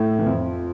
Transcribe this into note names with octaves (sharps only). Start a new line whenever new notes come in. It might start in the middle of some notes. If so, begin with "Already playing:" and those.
Already playing: A2 A3
E3
F2 F3